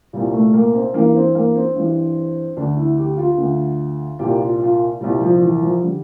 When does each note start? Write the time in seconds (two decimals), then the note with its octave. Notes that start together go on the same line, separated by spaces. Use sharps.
0.13 C2 A#2 G3
0.33 A3
0.54 A#3
0.74 C4
0.94 G2 E3 A#3
1.15 C4
1.35 A#3
1.55 C4
1.76 G2 E3
2.57 D2 D3 D4
2.77 E4
2.98 G4
3.17 F4
3.38 D2 D3
4.19 C2 A#2 G4
4.40 F4
4.60 F4
5.01 C2 A#2 G3
5.20 F3
5.41 E3
5.61 F3
5.82 D3 G3